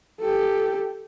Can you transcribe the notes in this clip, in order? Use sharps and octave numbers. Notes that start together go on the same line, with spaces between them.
G4 A4